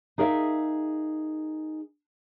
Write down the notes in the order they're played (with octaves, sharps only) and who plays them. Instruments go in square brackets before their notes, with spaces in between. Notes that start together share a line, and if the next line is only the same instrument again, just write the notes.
[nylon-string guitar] D#4 G#4 A#4 C5 E5 F5